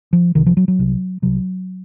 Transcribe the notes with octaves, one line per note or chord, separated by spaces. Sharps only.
F3
C#2 C3 D#3
F3
F#3
F#3
C2 C3
C2 C3 F#3